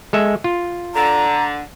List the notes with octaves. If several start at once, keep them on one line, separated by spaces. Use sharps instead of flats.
G#3 A4 E5
F4
D3 A#5